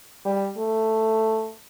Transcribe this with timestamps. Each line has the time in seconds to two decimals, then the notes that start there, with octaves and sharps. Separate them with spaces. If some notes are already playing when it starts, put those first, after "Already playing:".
0.25 G3
0.57 A3